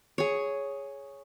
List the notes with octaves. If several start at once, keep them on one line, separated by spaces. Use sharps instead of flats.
G#4 C#5